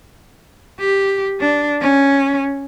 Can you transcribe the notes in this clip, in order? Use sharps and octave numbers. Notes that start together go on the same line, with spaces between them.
G4
D4
C#4